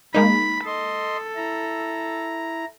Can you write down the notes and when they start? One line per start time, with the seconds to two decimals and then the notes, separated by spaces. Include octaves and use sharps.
0.14 G#3 A#3 D#4 B5
0.66 A4 D#5 C6
1.36 E4 A#5